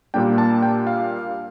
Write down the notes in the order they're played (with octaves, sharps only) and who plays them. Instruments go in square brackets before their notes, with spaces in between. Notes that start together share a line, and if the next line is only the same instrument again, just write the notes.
[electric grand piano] A#2 G3 A#3 D4 G5
A5
G5
F5